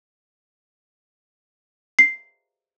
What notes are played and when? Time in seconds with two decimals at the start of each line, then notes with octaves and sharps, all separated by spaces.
1.99 C7